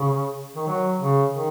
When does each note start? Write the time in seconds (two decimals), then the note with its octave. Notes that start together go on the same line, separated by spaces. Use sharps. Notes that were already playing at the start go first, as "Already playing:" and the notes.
Already playing: C#3
0.56 D#3
0.67 F#3
1.00 C#3
1.33 D#3